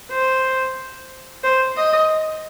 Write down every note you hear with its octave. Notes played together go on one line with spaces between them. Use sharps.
C5
C5
D#5